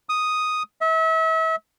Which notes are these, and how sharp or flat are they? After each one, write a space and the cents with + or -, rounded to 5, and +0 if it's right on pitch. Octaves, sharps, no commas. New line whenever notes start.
D#6 +0
E5 -35